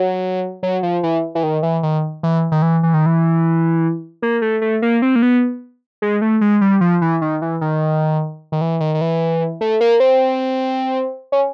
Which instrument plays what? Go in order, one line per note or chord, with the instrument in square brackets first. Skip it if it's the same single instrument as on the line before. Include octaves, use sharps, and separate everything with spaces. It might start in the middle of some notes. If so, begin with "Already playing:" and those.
Already playing: [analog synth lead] F#3
F#3
F3
E3
E3
D#3
E3
D#3
E3
D#3
E3
E3
D#3
E3
A#3
A3
A3
A#3
C4
A#3
B3
G#3
A3
G#3
G3
F3
E3
D#3
E3
D#3
D#3
E3
D#3
D#3
E3
A3
A#3
C4
C#4